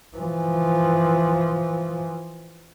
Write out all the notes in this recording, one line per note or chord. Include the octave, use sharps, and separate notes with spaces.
E3 F3